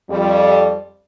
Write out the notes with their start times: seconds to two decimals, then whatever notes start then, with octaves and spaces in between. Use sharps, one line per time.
0.10 F2 G3